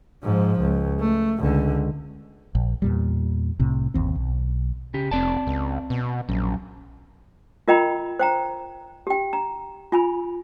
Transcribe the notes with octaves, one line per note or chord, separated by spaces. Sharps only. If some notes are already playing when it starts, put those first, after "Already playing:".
G#2 F3
C#2
A3
C#2 D3
A#1
E2 A#2 G3
C2 A2 C3
G1 D#2 C4
B1
C#3 G4
F1 C4 D5 A5
C#2
B2
A#1 F#2
F4 A#4 D#5 G5 A#5 B5
C5 G5 A#5
G4 G5
A#5
F4 G#5 B5